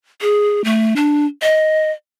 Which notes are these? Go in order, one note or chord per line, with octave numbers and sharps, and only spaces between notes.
G#4
A3
D4
D#5